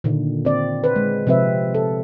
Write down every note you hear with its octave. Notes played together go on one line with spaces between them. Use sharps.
A#2 D3 D#3
C4 D5
B4 C5
G#3
C3 F3 C4 B4 E5
A4